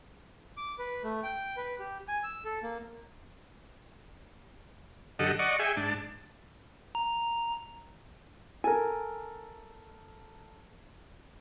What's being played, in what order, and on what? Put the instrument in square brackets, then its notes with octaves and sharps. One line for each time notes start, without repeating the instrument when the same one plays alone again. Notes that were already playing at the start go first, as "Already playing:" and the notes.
[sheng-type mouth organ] D6
B4
A3
G5
B4
G4
G#5
E6
A4
A#3
[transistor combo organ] F#2 D3 G4 A4 D#5 F#5
D5 D#5 F#5 C#6
G#4 E5 G5 G#5
G#2 D4 A5
[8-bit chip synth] A#5
[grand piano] A4 A#4 [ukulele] G#5